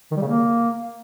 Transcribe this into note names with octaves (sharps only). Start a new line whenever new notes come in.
D#3
G3
C#3
A#3